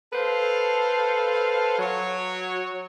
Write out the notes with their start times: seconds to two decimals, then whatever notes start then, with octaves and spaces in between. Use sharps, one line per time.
0.13 A4 B4 C5 F5
1.79 F#3 C#5